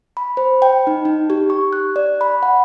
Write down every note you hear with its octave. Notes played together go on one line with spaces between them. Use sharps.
B5
C5
G5
D#4
D#4
G4
C#6
F#6
D5
B5
F#5